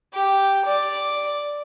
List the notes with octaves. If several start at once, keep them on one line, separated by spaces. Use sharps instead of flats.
G4
D5